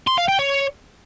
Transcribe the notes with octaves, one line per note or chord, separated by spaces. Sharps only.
C6
F5
G5
C#5